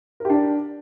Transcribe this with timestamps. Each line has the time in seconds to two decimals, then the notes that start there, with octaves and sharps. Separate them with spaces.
0.20 A#4
0.25 G4
0.30 D4